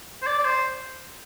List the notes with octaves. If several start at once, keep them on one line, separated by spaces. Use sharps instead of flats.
C5
D5
D5
C5